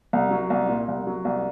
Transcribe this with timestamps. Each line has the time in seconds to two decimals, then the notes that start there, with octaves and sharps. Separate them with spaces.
0.13 C2
0.31 F#3
0.50 C2
0.69 A#2
0.88 C2
1.07 F#3
1.25 C2